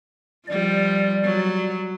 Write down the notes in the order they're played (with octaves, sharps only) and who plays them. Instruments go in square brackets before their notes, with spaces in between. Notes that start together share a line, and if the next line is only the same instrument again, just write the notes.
[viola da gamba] F3 G3 [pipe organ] D5
[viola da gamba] F#3